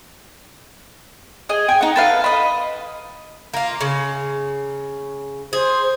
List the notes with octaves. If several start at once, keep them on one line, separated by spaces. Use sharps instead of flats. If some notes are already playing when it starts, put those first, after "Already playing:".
G#4 D#5
G5 G#5
D#4 F#5
A4 B4 F5
D#5 B5
A#3 F4
C#3
G#4 C5